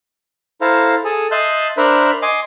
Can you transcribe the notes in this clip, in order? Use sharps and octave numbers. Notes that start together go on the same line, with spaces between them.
E4 A4 C5 F5 A#5
G#4 A4
D#5 E5 A5 C6 F#6 G6
D4 A#4 C5 E5 B5 F#6
D#5 G#5 C6 D6